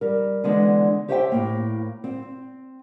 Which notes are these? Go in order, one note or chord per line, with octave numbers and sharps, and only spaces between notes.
G3 A#4
D3 E3 G#3 B3 D4
G4 C5 C#5 E5 F#5 G5
A2 A#3
C4